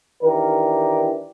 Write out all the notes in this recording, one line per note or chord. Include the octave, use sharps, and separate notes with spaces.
D#3 E3 D4 G4 A#4